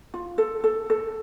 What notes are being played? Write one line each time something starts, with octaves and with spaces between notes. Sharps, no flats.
F4
A4
A4
A4